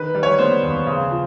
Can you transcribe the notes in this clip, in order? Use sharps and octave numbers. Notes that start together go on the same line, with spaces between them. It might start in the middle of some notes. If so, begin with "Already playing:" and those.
Already playing: D#3 B4
G3
C#5
B3 C5
D#2
C#3
F3